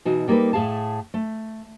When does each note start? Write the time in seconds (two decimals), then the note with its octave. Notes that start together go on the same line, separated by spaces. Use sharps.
0.05 B2 E3 D#4 F#4
0.28 G3 A#3 D#4 G#4 A4 B4
0.53 A2 A3 C#4 G#4 F5 A5
1.14 A3